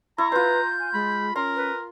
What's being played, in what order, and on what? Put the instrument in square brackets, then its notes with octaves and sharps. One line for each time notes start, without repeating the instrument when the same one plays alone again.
[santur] E4 [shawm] A#5 [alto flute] C#6
[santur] F4 C6 [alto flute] B4 [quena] G6
[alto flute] G#5
[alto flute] G#3 [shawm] B5
[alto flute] C#4 [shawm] A#4 [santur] C6
[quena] B4